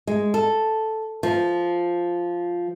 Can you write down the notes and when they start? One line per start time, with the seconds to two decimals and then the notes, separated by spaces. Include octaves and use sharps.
0.07 G#3
0.34 A4
1.23 F3